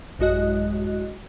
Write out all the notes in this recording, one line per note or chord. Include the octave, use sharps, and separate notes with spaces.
A1 F#2 G#3 F#4 D#5 F#6